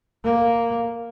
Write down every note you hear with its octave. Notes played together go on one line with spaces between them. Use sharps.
A#3